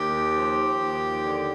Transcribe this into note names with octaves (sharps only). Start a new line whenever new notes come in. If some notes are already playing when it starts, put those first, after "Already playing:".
Already playing: D#2 G4
F3
D#2
D3